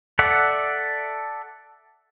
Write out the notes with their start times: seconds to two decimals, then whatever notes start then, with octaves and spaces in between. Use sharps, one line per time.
0.19 A4 D5 E5 F#5